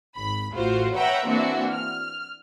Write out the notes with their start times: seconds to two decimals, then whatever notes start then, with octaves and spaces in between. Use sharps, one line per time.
0.16 G#1 B5
0.53 A1 F4 F#4 C5
0.94 B4 C#5 E5 F#5 G5 A#5
1.26 E3 A#3 C4 D4 F#4 E5
1.69 F6